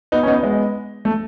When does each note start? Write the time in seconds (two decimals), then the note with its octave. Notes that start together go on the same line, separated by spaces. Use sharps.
0.12 B3 D#4
0.23 C#4
0.27 B3 D#4
0.43 G#3 B3
1.05 A3